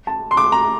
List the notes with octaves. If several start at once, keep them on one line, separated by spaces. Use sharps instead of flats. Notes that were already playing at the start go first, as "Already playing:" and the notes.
A5
C6
D6
A#5